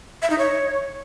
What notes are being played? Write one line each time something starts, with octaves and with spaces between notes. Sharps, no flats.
E5
D#4
C#5